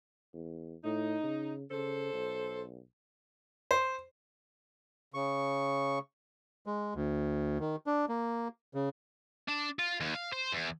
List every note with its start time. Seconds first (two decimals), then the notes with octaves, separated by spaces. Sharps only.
0.34 E2
0.84 A2 D#4
1.23 C#3
1.71 C#3 A4 C5
2.13 B1
3.71 C5
5.14 C#3 C#6
6.66 G#3
6.95 D2
7.60 D#3
7.86 D4
8.09 A#3
8.74 C#3
9.48 D4
9.79 F4
10.01 D#2
10.15 F5
10.33 C5
10.52 E2